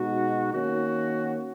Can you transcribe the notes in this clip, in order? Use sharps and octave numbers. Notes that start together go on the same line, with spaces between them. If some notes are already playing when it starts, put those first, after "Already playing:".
Already playing: B2 G#3 D#4 F#4
D#3 A#3 C#4 F#4